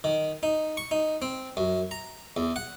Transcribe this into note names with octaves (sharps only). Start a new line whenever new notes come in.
D#3
D#4
C#6
D#4
C4
F#2
A#5
E2
F#5